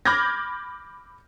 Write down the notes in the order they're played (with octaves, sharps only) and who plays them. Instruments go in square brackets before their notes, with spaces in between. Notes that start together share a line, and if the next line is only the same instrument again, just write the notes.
[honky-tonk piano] B5 D6 F6 G6 G#6 A#6